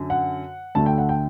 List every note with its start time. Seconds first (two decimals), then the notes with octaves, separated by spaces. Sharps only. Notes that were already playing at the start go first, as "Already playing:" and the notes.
Already playing: F#2 D3
0.10 F#5
0.75 D2 D3 A3 A5
0.86 G5
0.98 F#5
1.09 G5